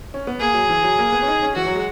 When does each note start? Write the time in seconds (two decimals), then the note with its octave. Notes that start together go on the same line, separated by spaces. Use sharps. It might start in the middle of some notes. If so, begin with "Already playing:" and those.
0.14 C#4
0.27 B3
0.40 A#3 G#4
0.54 F#3
0.69 E3
0.84 F#3
0.99 A#3
1.12 B3
1.23 C#4
1.28 D#4
1.42 C#4
1.56 E3 F#4
1.67 F#3
1.75 G#3